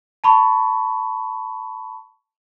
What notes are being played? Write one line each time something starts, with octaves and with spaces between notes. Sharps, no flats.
A5 B5 C#6